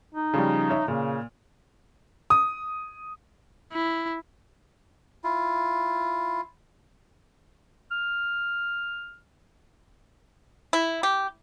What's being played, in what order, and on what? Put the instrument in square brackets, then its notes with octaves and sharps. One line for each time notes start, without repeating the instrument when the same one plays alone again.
[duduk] D#4
[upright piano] C#3 F3 G3
C#5 E5
[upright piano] A#2 [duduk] C#3
[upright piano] D#6
[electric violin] E4
[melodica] E4 F4
[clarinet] F6
[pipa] E4
G4